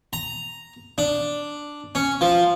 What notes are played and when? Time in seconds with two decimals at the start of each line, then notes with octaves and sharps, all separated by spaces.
0.13 A#5
0.98 D4
1.95 C#4
2.21 F3